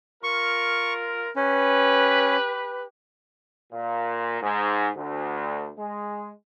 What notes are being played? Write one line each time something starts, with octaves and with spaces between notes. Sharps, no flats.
F4 A#4 C#6
C#4 G4 B4
A#2
G#2
D2
G#3